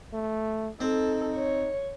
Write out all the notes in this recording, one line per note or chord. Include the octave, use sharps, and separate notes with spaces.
A3
C4 D#4 A4
C#5